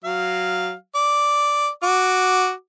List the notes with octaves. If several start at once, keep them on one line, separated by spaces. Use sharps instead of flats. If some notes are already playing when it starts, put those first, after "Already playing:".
F#3 F5
D5
F#4 D6